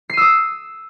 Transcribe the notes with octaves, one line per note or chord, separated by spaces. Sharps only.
D#6 E6 C7 D#7